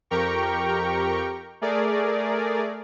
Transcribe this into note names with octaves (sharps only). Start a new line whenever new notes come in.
F2 G4 A#4 G5 A#5 C#6
A3 G#4 A#4 D5